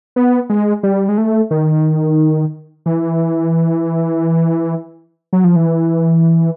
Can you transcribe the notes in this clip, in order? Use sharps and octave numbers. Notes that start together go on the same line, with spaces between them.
B3
G#3
G3
G#3
A3
D#3
E3
F#3
F3
E3